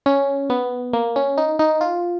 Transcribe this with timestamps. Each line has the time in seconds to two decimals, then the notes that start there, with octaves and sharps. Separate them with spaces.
0.06 C#4
0.50 B3
0.93 A#3
1.16 C#4
1.38 D#4
1.59 D#4
1.81 F4